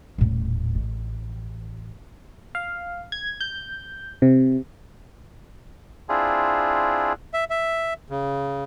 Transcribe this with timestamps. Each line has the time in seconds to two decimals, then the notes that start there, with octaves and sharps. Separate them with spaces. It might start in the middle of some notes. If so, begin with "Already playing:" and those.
0.18 D#1 A2
0.75 A1
2.55 F5
3.12 G#6
3.41 G6
4.22 C3
6.09 C4 D4 E4 F4 G#4
7.34 E5
7.50 E5
8.10 C#3